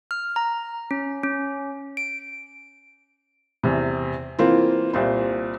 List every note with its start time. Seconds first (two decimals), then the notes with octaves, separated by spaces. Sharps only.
0.11 F6
0.36 A#5
0.91 C#4
1.23 C#4
1.97 D7
3.63 E2 C3
4.39 E3 A#3 C4 F4
4.93 C2 A#2 C5